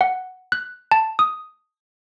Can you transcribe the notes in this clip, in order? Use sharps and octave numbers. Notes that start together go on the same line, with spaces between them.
F#5
F#6
A5
D#6